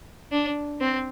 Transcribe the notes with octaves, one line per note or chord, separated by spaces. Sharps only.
D4
C4